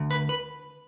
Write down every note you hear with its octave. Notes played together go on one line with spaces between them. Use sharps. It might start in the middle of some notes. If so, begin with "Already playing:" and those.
Already playing: D2
B4
B4